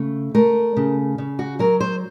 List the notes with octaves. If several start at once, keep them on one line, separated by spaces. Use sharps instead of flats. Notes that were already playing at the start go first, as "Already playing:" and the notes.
Already playing: C#3 A3
A3 A#4
C#3
C#3
F#4
F#3 A#4
C5